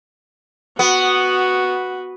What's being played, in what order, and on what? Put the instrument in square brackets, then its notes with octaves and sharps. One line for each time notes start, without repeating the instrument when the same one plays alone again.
[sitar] B3 [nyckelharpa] F#4